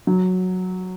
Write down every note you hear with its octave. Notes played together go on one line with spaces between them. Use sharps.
F#3